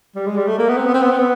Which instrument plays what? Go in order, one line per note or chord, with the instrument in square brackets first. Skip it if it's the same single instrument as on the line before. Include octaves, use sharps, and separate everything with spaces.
[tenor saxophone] G3
G#3
G3
A3
A#3
B3
C4
B3
C4
B3
C4
B3